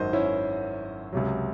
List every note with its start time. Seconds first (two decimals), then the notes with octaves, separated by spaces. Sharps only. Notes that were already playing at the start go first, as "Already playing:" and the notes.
Already playing: G#1 F#2 D#3 F#3 C5 D#5
0.13 C#4 E4
1.13 C#2 C3 F#3